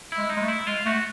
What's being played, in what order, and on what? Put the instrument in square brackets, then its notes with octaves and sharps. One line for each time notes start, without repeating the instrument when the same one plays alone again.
[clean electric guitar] E4
[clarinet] G#3
[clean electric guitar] D#4
[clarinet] G#3
A3
[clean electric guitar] E4
[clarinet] G#3 [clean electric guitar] F4
[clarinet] A3 [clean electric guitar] F#4